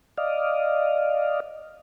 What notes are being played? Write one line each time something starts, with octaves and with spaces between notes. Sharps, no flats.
D5 D#5 F5